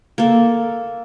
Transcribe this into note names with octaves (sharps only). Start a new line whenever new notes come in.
A#3 A4